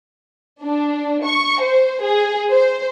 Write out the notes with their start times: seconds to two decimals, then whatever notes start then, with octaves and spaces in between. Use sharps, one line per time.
0.63 D4
1.25 C#6
1.61 C5
2.01 G#4
2.50 C5